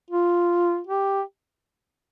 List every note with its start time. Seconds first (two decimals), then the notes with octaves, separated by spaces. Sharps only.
0.11 F4
0.87 G4